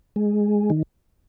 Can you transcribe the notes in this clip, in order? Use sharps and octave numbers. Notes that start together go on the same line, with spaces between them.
G#3
D#3